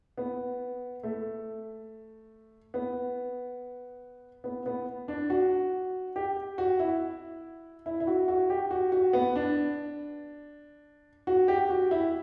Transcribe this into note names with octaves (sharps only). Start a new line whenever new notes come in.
B3
A3
B3
B3
B3
D4
F#4
G4
F#4
E4
E4
E4
F#4
F#4
G4
F#4
F#4
B3
D4
F#4
G4
F#4
E4